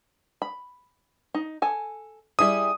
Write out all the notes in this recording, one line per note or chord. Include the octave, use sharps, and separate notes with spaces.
B5
D#4
A4 G#5
G3 E4 G#4 D#6